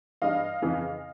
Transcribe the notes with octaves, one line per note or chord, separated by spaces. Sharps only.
G2 E3 D#5 F5
F2 C#3 E3